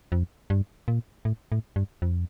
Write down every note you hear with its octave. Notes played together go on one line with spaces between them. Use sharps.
F2
G2
A#2
A2
A2
G2
F2